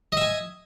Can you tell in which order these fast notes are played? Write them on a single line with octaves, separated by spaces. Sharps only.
D#5 E5 G#5